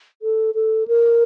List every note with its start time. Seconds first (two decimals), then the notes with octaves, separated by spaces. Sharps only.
0.22 A4
0.54 A4
0.88 A#4